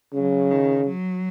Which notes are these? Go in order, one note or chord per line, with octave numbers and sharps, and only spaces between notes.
C#3 F#3
D#3
F#3